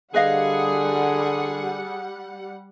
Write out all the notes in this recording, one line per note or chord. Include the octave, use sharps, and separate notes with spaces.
D3 G3 G#4 B4 D#5 F5 F#5